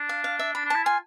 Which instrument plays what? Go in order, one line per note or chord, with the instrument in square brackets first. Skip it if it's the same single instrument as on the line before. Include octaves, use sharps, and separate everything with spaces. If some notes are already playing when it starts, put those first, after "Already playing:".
Already playing: [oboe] D4
[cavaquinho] F5
F5
E5
[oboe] D4 [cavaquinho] B5
[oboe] D4
[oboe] E4 [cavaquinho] A5
[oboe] F4 [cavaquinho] G#5